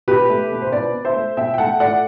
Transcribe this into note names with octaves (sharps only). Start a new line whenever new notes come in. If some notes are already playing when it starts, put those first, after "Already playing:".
B2 G4 B4
A3
B2
C5
B2 B4 D5
B2
C5 E5
A3
B2 E5 G5
G5
A3 F#5 A5
A3 D5 F#5